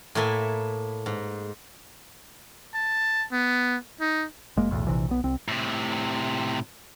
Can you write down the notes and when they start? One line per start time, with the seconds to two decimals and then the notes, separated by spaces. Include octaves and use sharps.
0.15 A2 A#3 E4 A4 E5 G#5
1.06 G#2
2.74 A5
3.32 B3
4.00 D#4
4.57 F#1 G#3 A#3
4.71 B1 E2 A2
4.87 A#1 C3 E3
5.08 B1 B3
5.24 C2 C4
5.48 A2 C3